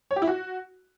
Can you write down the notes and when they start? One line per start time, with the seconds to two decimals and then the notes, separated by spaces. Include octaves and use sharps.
0.11 C#5
0.16 G4
0.22 E4
0.27 F#4